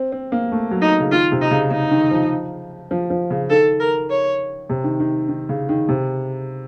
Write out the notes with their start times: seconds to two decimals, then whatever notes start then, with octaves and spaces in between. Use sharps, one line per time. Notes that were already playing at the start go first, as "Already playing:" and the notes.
Already playing: C4
0.12 C4
0.32 A#3
0.52 A3
0.71 F#3
0.81 D#4
1.00 C#3
1.11 D#3 F4
1.32 C3
1.41 D#4
1.51 C#3
1.71 C#3 D#4
1.91 D#3
2.11 F3
2.91 F3
3.10 F3
3.30 C#3
3.50 D#3 A4
3.80 A#4
4.10 C#5
4.69 C3
4.84 D#3
5.00 D#3
5.29 D#3
5.49 C#3
5.69 D#3
5.89 C3